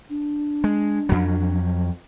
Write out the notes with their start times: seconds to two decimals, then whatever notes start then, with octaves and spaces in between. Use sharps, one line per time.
0.10 D4
0.64 G#3
1.09 F2 F#3